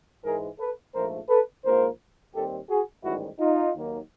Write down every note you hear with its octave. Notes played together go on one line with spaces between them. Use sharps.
G#2 E3 G#3 G#4 A#4
A4 B4
A#1 G#2 F3 A3 A#4 C5
A4 B4
A#1 G#2 F3 A#3 A#4 C5
D#2 D#3 G3 C4 G4 A4
F#4 G#4
A1 G#2 D#3 G3 E4 F#4
D#4 F4
D#2 D#3 F#3 A#3